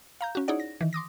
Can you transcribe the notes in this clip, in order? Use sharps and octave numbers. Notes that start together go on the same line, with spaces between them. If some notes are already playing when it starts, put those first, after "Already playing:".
F5 A#5 G6
C#4 F#4
D#4 E4 G#4 C#5 D5 F#5
A#6
D#3 E3
C6 D6 D#6 A#6